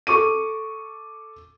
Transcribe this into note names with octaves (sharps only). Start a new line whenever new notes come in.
A4 C#6 D6 D#7